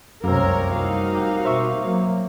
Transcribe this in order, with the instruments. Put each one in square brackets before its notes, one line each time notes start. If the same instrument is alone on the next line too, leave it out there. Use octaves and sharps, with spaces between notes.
[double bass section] F1 C2 G3 [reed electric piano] F#2 [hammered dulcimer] A#3 C4 [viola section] A#4 C#5
[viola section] D#4 F#4 F5
[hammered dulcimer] G4
[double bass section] B2 [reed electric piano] C5 E5 C#6
[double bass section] F#3 A#3